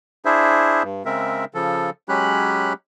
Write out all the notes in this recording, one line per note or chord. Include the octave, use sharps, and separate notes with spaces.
D4 E4 G#4 C5 E5
G2
C#3 G#3 C4 A#4 E5
C#3 F3 A4
F#3 G#3 C#4 G4 B5 F#6